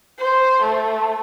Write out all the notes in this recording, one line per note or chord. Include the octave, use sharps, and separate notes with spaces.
C5
A3